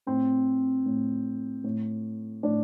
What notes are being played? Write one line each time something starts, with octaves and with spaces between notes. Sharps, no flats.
A2 C4
A2
A2
A2 D4